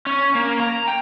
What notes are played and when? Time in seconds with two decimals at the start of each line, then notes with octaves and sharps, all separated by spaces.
0.06 C#4
0.35 A#3
0.60 A#5
0.88 G5